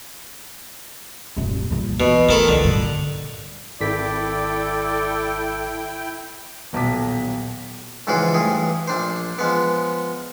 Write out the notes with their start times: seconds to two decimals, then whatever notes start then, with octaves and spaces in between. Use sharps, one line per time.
1.37 D#1 F#2
1.70 A#1 G3
2.00 B2 D3 E3
2.29 D#3 E3 A3 A4 B5
2.48 C#2 D3
2.64 G2 A#2
3.81 G#1 E4 A4 D5 G5 B6
6.73 D#1 B1 A5 D6 B6
8.07 C#2 G#2 E3 F3 F#4 G#4
8.34 A1 G2 G#4 D#6
8.88 A#1 D4 C5
9.39 F3 G#3 B3